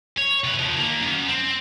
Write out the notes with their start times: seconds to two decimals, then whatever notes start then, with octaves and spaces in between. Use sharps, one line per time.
0.18 C#5
0.44 C3 B4
0.59 D#2 F3
0.77 D#3 A#3
1.02 F#2
1.28 C4